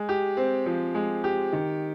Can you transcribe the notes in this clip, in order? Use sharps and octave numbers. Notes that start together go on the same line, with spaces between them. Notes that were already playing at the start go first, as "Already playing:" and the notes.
Already playing: G#3
G4
C4
F3
G#3
G4
D#3